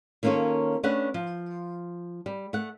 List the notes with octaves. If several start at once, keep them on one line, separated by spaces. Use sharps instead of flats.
D#3 A#3 C#4 F4 A4 C#5
A3 C#4 D4 B4 F#5
F3
G3
A3 F#5